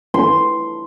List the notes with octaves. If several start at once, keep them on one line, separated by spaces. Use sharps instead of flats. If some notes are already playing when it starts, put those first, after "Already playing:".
C6